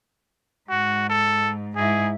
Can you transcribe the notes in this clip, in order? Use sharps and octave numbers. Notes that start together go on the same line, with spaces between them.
G#2 F#4
A4
G#2 E4 G#4